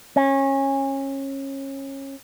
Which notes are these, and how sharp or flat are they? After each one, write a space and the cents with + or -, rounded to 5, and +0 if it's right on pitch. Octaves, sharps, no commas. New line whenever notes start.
C#4 -25